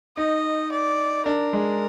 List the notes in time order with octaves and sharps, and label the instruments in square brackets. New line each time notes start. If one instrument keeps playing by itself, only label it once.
[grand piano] D#4 [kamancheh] D#5
[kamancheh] D5
[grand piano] D4 [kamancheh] A#4
[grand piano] G#3